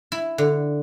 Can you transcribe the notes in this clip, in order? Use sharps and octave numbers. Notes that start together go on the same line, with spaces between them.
E4
D3